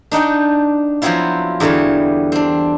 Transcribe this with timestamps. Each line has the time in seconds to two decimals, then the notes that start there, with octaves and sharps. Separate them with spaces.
0.12 D4 D#4 F#5 G5
1.02 F3 F#3 B3 C4 E4 F4
1.60 E2 D3 E3 G3 C#5
2.32 C4 D4